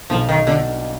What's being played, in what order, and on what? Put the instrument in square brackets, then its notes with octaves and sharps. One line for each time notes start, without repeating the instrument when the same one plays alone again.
[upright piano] B1 [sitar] F3
[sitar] D#3
[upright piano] B2 [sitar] D3